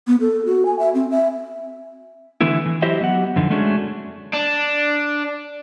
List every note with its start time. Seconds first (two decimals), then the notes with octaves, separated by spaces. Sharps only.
0.07 B3
0.21 A4
0.45 F#4
0.66 G#5
0.79 E5
0.95 C4
1.11 E5
2.41 D3 E3 A3 B3 E4
2.66 E3
2.82 F#3 E4 G4 C5 D#5 E5
3.01 F#3 B3 G4 F#5
3.36 F2 D3 E3 D#4
3.50 G#3 A3 C#4 D4 F#4 G#4
4.34 D4